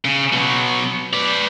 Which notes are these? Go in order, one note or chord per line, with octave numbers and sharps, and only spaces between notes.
C#3
B2 F#3
B4 D5